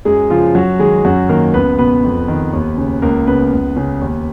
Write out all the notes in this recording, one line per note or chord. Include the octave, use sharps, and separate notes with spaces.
F#2 G#3 G#4
C#3 F3 F4
F#2 F#3 F#4
D#3 G#3 G#4
F#2 F#3 F#4
D#3 A#3 A#4
C#2 B3 B4
B2 B3 B4
F2
D#3
D#2
C#3
C#2 A#3 A#4
C#3 B3 B4
C#2
C#3
D#2